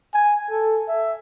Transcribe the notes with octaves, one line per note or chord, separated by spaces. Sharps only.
G#5
A4
E5